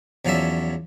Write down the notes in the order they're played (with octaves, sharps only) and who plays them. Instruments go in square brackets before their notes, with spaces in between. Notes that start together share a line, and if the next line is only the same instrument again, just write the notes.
[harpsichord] E2 F3 F#3 C#4 D5 E5